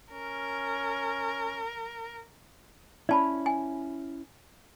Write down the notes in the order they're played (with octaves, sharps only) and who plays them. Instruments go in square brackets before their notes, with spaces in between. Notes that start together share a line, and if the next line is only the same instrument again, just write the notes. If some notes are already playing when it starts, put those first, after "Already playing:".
[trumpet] C#4 [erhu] A#4
[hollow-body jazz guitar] C#4 E4 [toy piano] D5 A5 B5
[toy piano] G#5